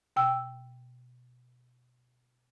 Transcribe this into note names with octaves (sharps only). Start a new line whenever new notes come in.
B2 G5 E6